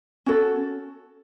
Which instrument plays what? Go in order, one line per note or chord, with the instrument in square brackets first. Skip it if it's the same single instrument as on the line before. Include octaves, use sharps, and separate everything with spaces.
[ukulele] C#4 F#4 A4